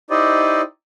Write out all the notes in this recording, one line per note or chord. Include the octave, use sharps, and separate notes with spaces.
D#4 E4 G4 C5 D5 D#5